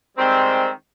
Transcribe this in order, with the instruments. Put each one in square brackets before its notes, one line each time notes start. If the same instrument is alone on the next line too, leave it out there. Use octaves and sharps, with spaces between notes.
[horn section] D#3 G3 G#3 C4